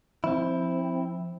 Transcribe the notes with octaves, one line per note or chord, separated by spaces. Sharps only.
F3 C4 E4